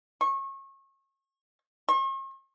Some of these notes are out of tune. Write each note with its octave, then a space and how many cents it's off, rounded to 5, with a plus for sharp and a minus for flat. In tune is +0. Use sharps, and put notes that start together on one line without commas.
C#6 -30
C#6 -45